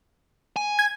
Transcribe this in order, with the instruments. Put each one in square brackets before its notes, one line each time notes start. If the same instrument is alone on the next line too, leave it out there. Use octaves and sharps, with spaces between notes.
[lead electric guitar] G#5
[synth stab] G#6